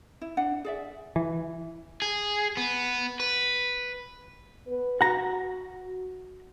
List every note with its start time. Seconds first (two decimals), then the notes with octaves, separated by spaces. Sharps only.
0.21 E4
0.37 D4 F#5
0.65 G#4 D5 E5
1.16 E3
2.02 G#4
2.57 B3
3.20 B4
4.67 B3 B4
5.01 F#4 F#5 A#5